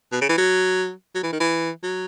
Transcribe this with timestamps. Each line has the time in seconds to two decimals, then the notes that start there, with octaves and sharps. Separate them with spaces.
0.12 B2
0.21 C#3
0.29 E3
0.37 F#3
1.15 F#3
1.23 E3
1.32 D#3
1.40 E3
1.83 F#3